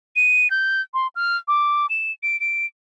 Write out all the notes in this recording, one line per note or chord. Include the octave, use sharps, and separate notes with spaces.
D#7
G6
C6
F6
D6
E7
D7
D7